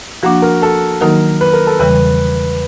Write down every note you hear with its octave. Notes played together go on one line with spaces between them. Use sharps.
F3 A#3 D4 F#4
A#4
A4
D#3 F#3 A#3 D#4 F#4 A#4
B4
A#4
A4
E2 C#3 E3 G3 B4